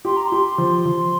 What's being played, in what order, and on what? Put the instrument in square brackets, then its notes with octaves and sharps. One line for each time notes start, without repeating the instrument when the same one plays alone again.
[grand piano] G4 [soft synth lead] C6
[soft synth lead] A#5
[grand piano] G4 [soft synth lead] C6
[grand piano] F3
F3